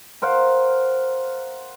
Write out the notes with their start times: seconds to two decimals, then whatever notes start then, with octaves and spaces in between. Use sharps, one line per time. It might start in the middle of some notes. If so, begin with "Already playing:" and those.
0.22 A#4 C5 F5 F#5